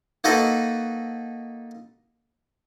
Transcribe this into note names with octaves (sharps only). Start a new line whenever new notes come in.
A#3 D#4 F#4 A4 B4